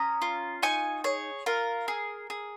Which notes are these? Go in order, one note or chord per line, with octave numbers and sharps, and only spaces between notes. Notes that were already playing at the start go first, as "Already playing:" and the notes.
Already playing: C#4 A#5 D#6
F4
D#4 G#5 C#6
G#4 C#5
F4 A#4
G#4
G#4